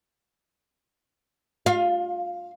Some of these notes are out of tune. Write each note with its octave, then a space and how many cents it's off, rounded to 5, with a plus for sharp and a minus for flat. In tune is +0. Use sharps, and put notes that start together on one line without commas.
F4 +30 F5 +0